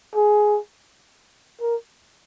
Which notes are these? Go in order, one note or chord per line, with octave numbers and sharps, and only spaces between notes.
G#4
A#4